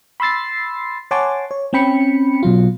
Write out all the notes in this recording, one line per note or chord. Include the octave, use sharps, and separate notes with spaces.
B5 C6 E6 A6 C7
C#5 F#5 G#5 A5 C6 D6
C#5
C4 C#4 G5 B5 C#7
B2 F#3 F4